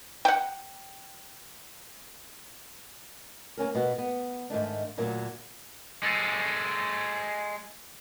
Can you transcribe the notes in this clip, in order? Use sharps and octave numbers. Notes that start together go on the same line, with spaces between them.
F#5 G5
A#3 C4 C#4 A#4
B2 A#3 B3 F#4
B3
G#2 D#3 A3 D4
D2 A#2 F#3 A#3
G#3 A4